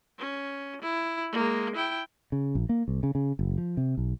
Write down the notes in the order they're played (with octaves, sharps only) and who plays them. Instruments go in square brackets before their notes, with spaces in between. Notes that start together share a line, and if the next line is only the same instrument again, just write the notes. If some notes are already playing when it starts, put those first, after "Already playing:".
[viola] C#4
E4
G#3 A#3
E4 G5
[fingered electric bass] C#3
A#1
A#3
C2
C#3
C#3
F#1
F3
C3
B1